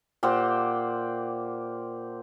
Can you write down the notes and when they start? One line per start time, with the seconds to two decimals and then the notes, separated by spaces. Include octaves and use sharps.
0.23 A#2 G4 C5 F#5